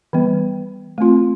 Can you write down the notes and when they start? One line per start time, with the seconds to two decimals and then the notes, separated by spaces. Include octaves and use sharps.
0.13 E3 G3 B3
0.98 A3 C4 F4